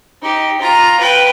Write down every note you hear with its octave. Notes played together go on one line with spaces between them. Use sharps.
D#4 G4
F4 A#5
B4 G5